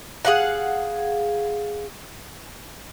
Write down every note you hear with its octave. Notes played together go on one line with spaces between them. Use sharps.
G#4 F5 F#5